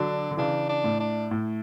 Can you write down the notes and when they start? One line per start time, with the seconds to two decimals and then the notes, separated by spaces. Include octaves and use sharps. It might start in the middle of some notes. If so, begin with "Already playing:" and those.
Already playing: D3 F#3 D4
0.31 D3
0.37 C#3 E3 D4
0.69 D4
0.84 A2
1.00 D4
1.31 A2